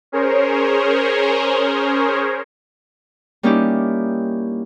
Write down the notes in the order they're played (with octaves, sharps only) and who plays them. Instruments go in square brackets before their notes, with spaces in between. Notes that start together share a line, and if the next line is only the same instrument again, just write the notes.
[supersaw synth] C#4 G#4 A#4 C5 C#5
[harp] G3 A#3 C#4 D#4 E4 G4